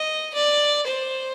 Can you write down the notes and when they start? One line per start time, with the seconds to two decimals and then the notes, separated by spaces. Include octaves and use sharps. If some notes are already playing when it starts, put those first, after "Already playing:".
Already playing: D#5
0.34 D5
0.86 C5